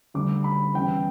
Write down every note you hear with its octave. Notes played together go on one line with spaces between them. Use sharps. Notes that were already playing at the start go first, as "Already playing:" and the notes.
D2 D3 G3 D6
B5
E2 C#3 G3 G5